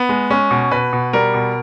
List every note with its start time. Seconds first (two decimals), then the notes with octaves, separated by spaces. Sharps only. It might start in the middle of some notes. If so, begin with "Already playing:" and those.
Already playing: B3
0.09 G#3
0.30 G#3 C#4
0.51 B2
0.71 B2 B4
0.93 B2
1.13 G3 A#4
1.34 B2